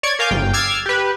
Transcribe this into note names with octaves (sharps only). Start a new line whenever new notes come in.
C#5 D5 C#6 G#6
A#4 F5 G#5 D6 G6
G1 G5
D6 E6 F6 G#6 A6 C7
G4 B4